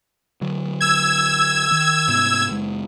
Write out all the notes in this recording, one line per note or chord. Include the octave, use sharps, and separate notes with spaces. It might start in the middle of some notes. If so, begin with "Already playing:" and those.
D3 F#3
E6 G#6
D#3
G#2 C3 B3
F#1 G#3